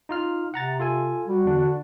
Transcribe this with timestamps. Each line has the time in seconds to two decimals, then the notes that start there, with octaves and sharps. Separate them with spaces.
0.09 D#4 F4 F6
0.54 C3 F#5 A#5 A6
0.80 F4 A4 G#5
1.27 G3 F#4
1.45 E2 D3 D4
1.58 D4